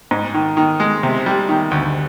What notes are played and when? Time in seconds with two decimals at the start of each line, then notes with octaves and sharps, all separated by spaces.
0.11 G#2
0.34 D#3
0.57 D#3
0.80 G#3
1.03 C3
1.26 G3
1.49 D#3
1.71 D2